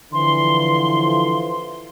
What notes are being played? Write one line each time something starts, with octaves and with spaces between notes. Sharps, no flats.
D3 E3 F3 C6